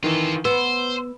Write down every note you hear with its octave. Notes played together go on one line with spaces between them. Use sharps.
D#3 E3 F4 A4
B3 C5 E6